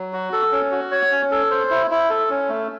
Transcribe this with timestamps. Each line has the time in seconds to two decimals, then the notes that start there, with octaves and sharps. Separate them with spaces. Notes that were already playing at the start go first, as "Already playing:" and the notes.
Already playing: F#3
0.13 F#4
0.33 A4
0.52 C#4
0.71 F#4
0.92 C#5
1.12 C#4
1.31 A4
1.51 C5
1.70 E4
1.91 E4
2.10 A4
2.30 C#4
2.49 A3